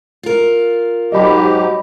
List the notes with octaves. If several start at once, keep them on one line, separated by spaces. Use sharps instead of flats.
F4 A#4
G#2 F#3 G4 D#5 B5